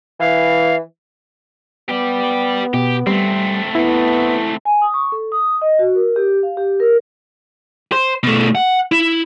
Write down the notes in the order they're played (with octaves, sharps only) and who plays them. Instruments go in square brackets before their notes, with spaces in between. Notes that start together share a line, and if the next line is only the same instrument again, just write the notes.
[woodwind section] E3 [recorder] F5
[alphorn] B3 [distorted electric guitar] G4 D5
[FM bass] B2 [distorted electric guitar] G4
[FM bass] G3 [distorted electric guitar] A3 C4
[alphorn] B3 [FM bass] E4
[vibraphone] G#5
D#6
C#6
A4
D#6
D#5
F#4
A#4
G4
F5
G4
A#4
[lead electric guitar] C5
B2 A3
F#5
E4